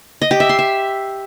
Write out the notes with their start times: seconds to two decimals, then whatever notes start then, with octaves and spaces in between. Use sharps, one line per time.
0.22 D#5
0.31 G4
0.40 E5
0.49 C6
0.59 E5